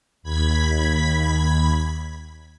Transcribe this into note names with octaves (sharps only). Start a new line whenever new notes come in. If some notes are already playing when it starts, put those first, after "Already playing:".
D#2 B5 G#6 B6